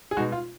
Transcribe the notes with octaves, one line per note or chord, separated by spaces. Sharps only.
G#4
B2 G#3 D#4 F#4
F4